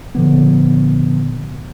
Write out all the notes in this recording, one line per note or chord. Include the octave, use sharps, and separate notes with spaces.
A#2 D3 F3 B3